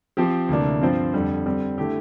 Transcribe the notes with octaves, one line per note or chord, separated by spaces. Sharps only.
F3 C4 G4
D2 C3 E3 A#3 D4
G2 F3 C4 F4 C5
F2 D3 G3
D3 G3 C4
D3 A3 E4 G4